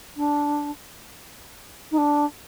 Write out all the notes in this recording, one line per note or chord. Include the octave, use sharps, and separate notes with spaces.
D4
D#4
D4